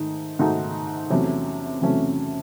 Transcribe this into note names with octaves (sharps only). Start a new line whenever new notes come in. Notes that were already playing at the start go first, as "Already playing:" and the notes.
Already playing: G#2 D#3 A3 D#4
G#2 D#3 A3 D#4 F#4
E2 C3 F#3 A3 C#4
E2 C3 F#3 A3 C#4